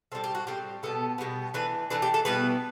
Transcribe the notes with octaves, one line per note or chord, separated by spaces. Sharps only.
A2 G3 C4 A4
G4
F#4
A2 G3 C4 G4
B2 G3 B3 A4
B2 G3 B3
E3 A3 D4 B4
E3 A3 D4 B4
G4
A4
B2 G3 B3 E4 B4